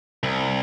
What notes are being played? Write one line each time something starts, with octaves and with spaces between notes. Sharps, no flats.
C2